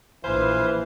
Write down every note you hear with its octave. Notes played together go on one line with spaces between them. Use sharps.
A#1 E3 B4 C5 F5 G#5